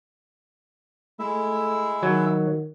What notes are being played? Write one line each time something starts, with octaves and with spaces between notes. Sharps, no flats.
G#3 A3 E4 E5
D#3 F#3